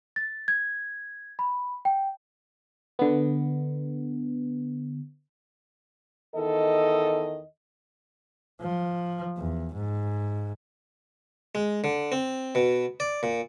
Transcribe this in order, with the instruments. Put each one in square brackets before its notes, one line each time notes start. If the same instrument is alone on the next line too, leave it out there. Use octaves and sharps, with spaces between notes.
[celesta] A6
G#6
B5
G5
[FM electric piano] D3 B3
[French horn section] E2 D#3 A4 D#5
[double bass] F3
E2
G#2
[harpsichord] G#3
D3
C4
B2
D5
A#2